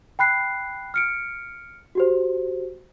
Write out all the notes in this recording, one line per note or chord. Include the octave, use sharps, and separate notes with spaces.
G5 B5 F#6 C7
F6 C#7 D7
F#4 G4 C5